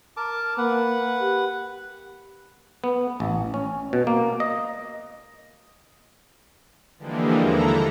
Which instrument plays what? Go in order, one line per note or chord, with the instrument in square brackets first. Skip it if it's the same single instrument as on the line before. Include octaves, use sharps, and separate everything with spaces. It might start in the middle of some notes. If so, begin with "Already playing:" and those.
[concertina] A#4 A5 D6
[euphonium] A#3 [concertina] B4 F#5
[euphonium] G4
[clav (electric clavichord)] B3
A1
C#4
B2
A#3
D#5
[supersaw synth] D3 E3 F3 G3 G#3 A#3
D#2 E4 A4 A#5